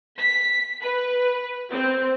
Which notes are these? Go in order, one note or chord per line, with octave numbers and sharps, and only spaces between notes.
B6
B4
C4